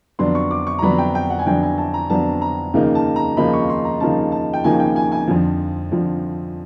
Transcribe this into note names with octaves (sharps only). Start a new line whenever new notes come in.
F2 D3 F#3 B3 D4 C6
C#6
D6
C#6
A#5
F2 D3 F#3 B3 D4 B5
G5
G5
F#5
G#5
F2 D3 F#3 B3 D4 G5
G#5
A5
A#5
F2 D3 F#3 B3 D4 A5
A#5
D#2 C#3 F3 A#3 D#4
A5
A#5
D#2 C#3 F3 A#3 D#4 B5
C#6
C6
A#5
D#2 C#3 F3 A#3 D#4 A5
A5
G5
D#2 C#3 F3 A#3 D#4 G#5
G5
G#5
G#5
F2 D3 F3
F2 D3 F3